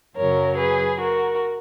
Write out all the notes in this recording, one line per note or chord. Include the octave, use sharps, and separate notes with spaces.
F#2 C#3 F#3 A#4 C#5
G#4 B4
F#4 A#4